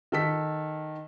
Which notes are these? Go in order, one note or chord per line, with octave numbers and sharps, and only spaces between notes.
D#3 A4 B6